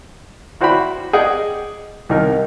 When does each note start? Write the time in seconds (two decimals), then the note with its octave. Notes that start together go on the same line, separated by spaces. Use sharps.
0.61 E4 F#4 C5 D5 G5 B5
1.13 G#4 D5 D#5 F#5 G5
2.09 C2 D#3 D#4 A#4